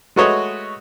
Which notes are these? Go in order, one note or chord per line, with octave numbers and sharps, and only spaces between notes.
G#3 A3 F#4 B4 C#5 D#5